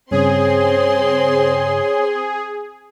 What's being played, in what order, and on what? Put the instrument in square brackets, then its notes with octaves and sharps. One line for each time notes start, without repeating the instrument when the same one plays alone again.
[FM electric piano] G2 C#3 [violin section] C4 C6 [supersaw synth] G#4 [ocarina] C#5